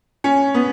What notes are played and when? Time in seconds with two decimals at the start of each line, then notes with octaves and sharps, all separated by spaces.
0.24 C#4
0.54 B3